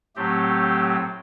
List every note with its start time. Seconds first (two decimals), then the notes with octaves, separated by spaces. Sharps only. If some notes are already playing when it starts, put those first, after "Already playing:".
0.16 A2 F#3 A3 C4 G4